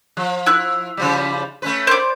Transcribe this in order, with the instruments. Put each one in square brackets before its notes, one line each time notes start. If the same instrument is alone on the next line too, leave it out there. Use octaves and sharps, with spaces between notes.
[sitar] F3
[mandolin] E4 F#6
[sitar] C#3 F3 G3
A3 C#4 B4
[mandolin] C5 D5